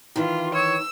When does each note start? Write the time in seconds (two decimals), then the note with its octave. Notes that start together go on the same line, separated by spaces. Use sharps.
0.16 D#3 E3 F4
0.55 C#5 E6